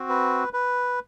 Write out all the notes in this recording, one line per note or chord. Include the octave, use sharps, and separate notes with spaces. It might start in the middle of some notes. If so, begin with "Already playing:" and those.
Already playing: C4 F#4
B4
B4